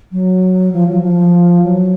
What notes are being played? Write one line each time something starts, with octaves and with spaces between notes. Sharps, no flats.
F#3
F3
F#3
F3
F#3